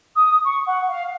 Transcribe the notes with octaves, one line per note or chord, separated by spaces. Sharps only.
D#6
C#6
F#5
F5